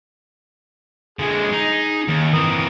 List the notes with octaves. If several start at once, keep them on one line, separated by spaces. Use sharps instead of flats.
D3 G#3 G#4
D#4
D#2
E3 C4 A#4 D#6